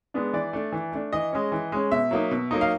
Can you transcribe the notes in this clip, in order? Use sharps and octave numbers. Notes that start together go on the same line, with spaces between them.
G#3 B3 D4
E3 D5
A3 D4
E3
A3 D4
E3 D#5
G#3 C#4
E3
G#3 C#4
B2 E5
F#3 A#3 D#4
B2
F#3 A#3 D#4
F5